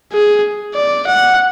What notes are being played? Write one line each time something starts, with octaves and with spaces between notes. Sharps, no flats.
G#4
D5
F#5